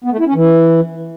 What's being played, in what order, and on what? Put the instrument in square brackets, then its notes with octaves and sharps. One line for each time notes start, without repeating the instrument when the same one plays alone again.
[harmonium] B3
A3
E4
C#4
E3